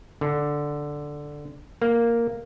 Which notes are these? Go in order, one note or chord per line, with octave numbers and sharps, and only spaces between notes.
D3
A#3